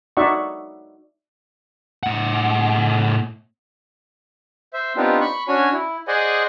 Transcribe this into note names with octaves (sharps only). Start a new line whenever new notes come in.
D#4 F#4 D5 E5 F#5 C#6
A2 F#5
C5 E5
B3 C4 D4 D#4 F4 G4
B5 C#6
C#4 D4 F#4 C#5 G#5
E4
G#4 C5 D5 D#5 F#5 G#5